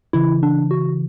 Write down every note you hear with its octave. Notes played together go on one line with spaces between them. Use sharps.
C#3 E3 E4
D4
F#4